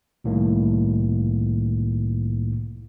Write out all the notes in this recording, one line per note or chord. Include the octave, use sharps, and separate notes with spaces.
C2 A2 D#3 A#3